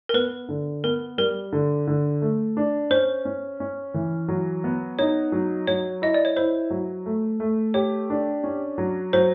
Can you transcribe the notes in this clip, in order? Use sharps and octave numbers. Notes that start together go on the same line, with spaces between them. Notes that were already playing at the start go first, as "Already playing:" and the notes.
A#4
B3 B4
D3
B3 A#4
G3 A#4
D3
D3
A3
D4
C#4 C5
C#4
C#4
E3
F#3
B3
D#4 C#5
F#3
F#3 C#5
E4 D#5
D5
C#5
E4 C5
F#3
A3
A3
G4 C#5
D4
C#4
F#3
F#3 C5